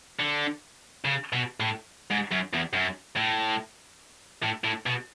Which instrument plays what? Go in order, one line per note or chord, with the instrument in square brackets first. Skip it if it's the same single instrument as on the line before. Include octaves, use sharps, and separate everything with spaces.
[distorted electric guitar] D3
C#3
B2
A2
G#2
F#2
E2
F#2
A2
A2
A2
B2